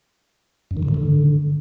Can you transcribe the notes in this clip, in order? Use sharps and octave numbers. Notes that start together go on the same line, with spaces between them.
F#2
D#3
D3
G#2
D3